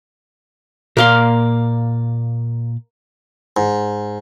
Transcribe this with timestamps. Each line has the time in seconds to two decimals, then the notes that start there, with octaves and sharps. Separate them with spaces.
0.97 A#2 A#3 D5 F5 C6
3.57 G#2